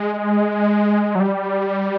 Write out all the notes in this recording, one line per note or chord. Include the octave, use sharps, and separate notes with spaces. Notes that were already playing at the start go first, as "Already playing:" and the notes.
Already playing: G#3
F#3
G3